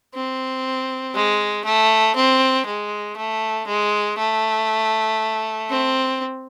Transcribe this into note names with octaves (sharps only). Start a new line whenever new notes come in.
C4
G#3
A3
C4
G#3
A3
G#3
A3
C4